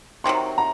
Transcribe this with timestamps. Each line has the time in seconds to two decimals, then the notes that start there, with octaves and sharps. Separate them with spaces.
0.24 C3 D#3 F#3 C6
0.58 A#5